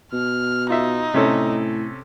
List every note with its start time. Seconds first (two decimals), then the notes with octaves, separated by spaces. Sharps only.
0.13 B2 F6
0.70 D#4 F4 E5
1.14 A2 C3 C#4 A4